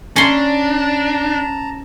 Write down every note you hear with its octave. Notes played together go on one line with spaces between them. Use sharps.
C#4 D4 A5 A#5 C6